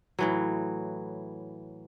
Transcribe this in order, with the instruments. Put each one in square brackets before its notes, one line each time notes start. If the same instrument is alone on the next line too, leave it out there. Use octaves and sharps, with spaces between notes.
[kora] A2 E3 F#3